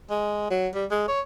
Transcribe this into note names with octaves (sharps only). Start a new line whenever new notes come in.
G#3
F#3
G3
G#3
C#5